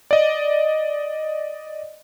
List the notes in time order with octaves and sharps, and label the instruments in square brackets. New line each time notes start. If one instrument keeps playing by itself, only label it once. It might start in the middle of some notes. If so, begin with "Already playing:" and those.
[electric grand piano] D5 D#5